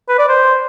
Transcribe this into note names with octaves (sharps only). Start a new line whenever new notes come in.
B4
D5
C5